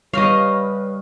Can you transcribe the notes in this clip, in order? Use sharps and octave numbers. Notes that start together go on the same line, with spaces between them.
C#3 G3 B4 C#5 D#5 F5